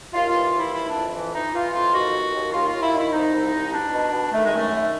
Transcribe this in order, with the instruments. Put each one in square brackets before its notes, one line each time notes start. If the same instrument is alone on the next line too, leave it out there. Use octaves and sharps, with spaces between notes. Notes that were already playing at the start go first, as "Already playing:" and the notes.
[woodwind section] D#2 F4
E3 F4
F4
D#2
E4
E3 E4
D4
F2
E3
E3 D#4
E3 F4
F2 F4
D#3 F#4
D#2
D#2
D#2 F4
F4
D#2
E4
D#3
E4
C2 D#4
C2
C2
B2 D4
B2
B2
D#3 A3
G#3
F#2 A3
D#3